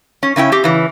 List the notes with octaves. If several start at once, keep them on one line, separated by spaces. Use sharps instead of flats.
C#4
C#3 C#4 E4 G5
C4 G4
C#3 E3